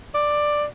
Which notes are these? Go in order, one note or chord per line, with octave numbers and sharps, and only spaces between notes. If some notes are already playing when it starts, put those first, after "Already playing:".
D5